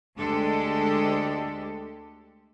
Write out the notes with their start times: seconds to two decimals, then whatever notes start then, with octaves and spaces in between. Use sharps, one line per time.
0.17 D2 G#3 D4 G4 A4